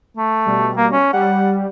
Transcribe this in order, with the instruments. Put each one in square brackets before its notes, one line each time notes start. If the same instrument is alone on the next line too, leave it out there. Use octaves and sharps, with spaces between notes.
[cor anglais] A3
[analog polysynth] B2 G3
[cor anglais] A#3
C#4
[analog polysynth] G3 [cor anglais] F#5